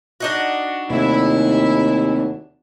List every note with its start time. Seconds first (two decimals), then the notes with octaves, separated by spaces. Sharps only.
0.20 D4 D#4 F#4
0.90 D#2 C3 A3 E4